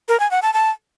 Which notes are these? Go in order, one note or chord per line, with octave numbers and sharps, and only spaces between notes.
A#4
G#5
F#5
A5
A5